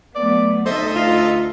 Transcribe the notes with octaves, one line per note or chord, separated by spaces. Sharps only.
F#3 A3 B3 D5
D2 D#4 A4 C5 D#5 E5
F4